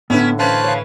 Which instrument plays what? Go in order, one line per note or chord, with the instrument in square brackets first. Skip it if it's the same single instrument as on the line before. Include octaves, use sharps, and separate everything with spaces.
[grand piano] A2 D3 [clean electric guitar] B3 [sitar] C#4 E4 B4
[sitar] E3 C#4 B4 [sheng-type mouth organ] C5 A5 F#6 [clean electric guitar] F5
[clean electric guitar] C#5 F5